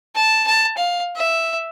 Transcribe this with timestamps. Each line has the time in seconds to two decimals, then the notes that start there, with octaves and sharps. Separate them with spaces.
0.15 A5
0.47 A5
0.77 F5
1.16 E5